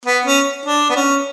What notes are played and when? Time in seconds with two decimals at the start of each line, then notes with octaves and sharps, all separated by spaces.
0.05 B3
0.25 C#4
0.65 D4
0.90 B3
0.96 C#4